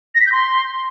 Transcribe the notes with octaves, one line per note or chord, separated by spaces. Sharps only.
A#6
B6
G6
C6